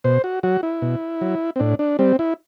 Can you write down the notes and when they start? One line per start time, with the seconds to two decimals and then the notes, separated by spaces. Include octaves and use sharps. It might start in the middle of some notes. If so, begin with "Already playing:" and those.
0.04 B2 C5
0.24 F#4
0.43 F#3 F#4
0.63 E4
0.82 B2
1.21 F#3
1.56 C4
1.59 A2 D4
1.79 D4
1.99 G3 C4
2.19 E4